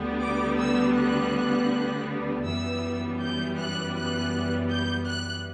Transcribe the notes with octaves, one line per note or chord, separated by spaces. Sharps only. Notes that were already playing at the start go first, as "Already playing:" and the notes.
Already playing: D2 D3 G3 B3
D6
E6
F#6
F#2 E3 G3 B3 E6
G6
F#6
F#6
G6
F#6